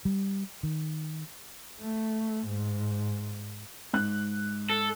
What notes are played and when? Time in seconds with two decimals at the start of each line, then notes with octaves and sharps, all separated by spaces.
0.05 G3
0.63 D#3
1.80 A3
2.47 G#2
3.93 G#2 F#6
4.70 A4